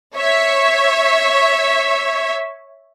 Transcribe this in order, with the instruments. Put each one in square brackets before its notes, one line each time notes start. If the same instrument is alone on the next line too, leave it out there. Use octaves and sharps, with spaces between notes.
[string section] C#5 E5